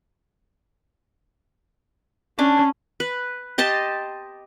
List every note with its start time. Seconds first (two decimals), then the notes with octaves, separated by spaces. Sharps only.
2.39 C#4 D4
3.00 B4
3.58 G4 D#5 A5 C6